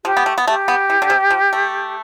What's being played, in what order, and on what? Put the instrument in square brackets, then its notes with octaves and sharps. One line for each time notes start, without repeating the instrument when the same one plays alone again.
[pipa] F3 [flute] G4
[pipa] B3
A3
B3
[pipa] A3 [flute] G4
[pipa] B3
E3
D3
C3
F3
A3